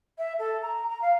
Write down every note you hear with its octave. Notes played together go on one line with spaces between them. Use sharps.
E5
A4
A#5
A#5
F5